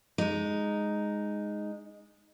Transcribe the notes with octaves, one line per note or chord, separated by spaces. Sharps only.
G#3 D#4